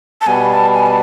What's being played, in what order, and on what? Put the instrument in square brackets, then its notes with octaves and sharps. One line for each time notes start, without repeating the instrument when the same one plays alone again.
[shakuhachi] A5
[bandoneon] B2 G3 B3 [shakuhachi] G#5
[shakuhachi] A5
G#5
A5